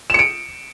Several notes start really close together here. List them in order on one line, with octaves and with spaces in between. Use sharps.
E7 C#7 D7